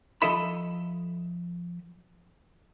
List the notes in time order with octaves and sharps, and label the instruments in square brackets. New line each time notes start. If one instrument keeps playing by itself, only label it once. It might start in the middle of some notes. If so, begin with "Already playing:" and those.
[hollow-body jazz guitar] F3 A4 D#5 E5 B5